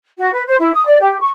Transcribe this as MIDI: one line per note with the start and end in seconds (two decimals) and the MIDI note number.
0.18 0.30 66
0.33 0.42 71
0.47 0.55 72
0.59 0.71 64
0.73 0.84 87
0.86 0.98 74
1.00 1.19 67
1.20 1.27 85